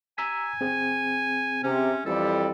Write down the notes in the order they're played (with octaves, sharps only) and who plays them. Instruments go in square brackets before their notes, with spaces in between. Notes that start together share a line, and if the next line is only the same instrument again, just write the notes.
[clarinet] G#5 [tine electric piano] A#5 E6 B6
[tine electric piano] C4 G#4
[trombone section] C3 [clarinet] C#4
[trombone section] F2 E3 G3 [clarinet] A4